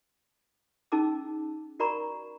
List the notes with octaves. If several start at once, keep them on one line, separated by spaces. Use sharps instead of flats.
C#4 D#4 G#4 A5 D6 E6
F#4 A#4 D5 A#5 B5 C#6